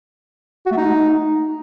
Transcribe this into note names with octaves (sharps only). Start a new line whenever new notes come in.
F#4
A3
D#4